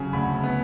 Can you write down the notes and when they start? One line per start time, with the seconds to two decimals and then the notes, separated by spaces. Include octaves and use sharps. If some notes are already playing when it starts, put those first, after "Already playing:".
Already playing: C#3 F#3 G#5
0.13 D2 B5
0.44 B3